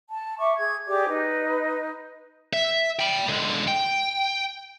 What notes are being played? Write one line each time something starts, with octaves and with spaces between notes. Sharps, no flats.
A5
E5 C#6 D6
G#4 G#6
G4 G#4 D5 D6
D#4 B4
E5
G5 B5
D3 G#3
G5